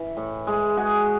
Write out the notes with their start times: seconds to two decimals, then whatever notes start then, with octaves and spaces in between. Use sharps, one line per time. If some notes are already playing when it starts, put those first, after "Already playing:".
Already playing: E3
0.17 A2
0.47 G#3
0.77 G#3 F#4 G#4